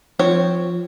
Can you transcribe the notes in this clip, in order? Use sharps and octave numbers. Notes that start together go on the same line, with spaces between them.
F3 C4 C5 C#5